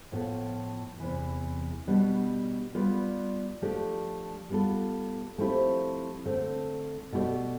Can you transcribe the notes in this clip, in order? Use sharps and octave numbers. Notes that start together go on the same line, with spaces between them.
A2 F3 B3 F4 A4
E2 C3 E3
B2 G3 B3 D4
G3 B3 F4 B4 D5
F3 A3 D4 G4 D5
G3 B3 F4 A4
F3 A3 C4 E4 G4
D3 A3 C4
B2 A3 E4 G4 D5